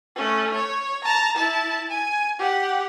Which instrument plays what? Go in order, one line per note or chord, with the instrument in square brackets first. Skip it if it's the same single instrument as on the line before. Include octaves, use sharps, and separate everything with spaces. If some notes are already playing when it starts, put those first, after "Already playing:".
[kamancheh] A3 C#4
C#5
A5 A#5
E4 A5
G#5
G4 F#5